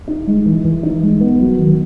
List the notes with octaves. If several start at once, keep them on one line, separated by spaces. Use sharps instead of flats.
D#4
G#3
E3
E3
D#4
G#3
B3
F#3
D#3